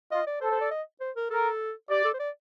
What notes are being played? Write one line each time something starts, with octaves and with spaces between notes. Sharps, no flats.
F4 D#5
D5
A4 C5
C5
D5
D#5
C5
A#4
A4 A#4
G4 D5
A4
C5
D5